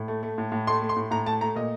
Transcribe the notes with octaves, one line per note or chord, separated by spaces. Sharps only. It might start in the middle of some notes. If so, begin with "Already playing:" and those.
Already playing: A2
A3
A3
A2
A2
A3 C6
A3
C6
A2
A2 A#5
A3 A5
A3 A#5
A#2 D#5